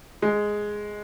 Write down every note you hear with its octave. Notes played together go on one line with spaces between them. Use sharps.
G#3